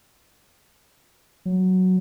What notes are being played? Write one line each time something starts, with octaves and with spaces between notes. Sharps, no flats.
F#3